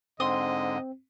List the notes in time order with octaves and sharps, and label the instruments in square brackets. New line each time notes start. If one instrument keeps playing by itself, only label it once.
[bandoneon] G#2 D3 [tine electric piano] C4 [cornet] D#5 [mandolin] C6 D#6